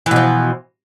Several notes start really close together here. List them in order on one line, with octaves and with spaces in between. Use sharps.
E3 B2 F3